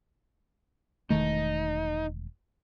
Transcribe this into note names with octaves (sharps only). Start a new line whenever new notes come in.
E1 D#3 A3 D#4